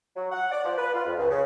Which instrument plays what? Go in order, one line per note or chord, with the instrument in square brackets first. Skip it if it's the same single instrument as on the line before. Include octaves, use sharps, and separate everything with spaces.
[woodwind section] F#3
F#5
D5
F3
B4
F4
F2
C#2
C#3